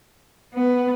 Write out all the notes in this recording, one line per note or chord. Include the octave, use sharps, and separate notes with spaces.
B3